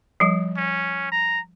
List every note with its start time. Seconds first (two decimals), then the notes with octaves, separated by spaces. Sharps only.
0.20 F3 G3
0.57 C#4
1.12 A#5